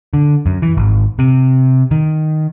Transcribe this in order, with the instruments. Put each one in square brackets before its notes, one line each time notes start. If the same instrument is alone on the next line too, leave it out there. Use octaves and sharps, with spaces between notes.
[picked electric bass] D3
F#2
E3
G#1
C3
D#3